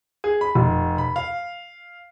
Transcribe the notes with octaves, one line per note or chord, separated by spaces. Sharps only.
G#4
B5
F1
B5
F5